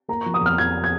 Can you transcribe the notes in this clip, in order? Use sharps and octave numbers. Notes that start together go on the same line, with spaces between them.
A#3 A#5
F3 C#6
D#6
F2 F6
F2 G#6
G#6